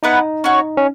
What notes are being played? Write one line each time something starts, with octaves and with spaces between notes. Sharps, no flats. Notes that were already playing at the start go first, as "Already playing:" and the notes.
B3 D#4 E4 B4 F#5
C#4 F#4 C#5
C#4